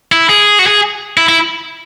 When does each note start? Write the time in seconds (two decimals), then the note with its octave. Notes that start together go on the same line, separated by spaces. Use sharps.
0.12 E4
0.29 G#4
0.59 F#4
0.67 G#4
1.17 E4
1.29 E4